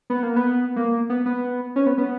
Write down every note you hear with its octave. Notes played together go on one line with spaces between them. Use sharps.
B3
A#3
B3
A#3
B3
B3
C#4
B3
B3